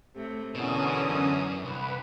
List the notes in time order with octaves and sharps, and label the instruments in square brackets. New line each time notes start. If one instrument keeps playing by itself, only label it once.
[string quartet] A2 C3 A3
[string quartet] E2 E3 A#4 [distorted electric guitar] B2 [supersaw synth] D3 C#4 D#6
[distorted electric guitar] F#2
[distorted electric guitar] C2 [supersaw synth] B4